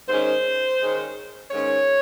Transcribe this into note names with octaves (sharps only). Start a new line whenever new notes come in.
G#2 D#3 G#3 C#4 C5
G#2 D#3 G#3 C#4
G#2 D#3 G#3 C#4 C#5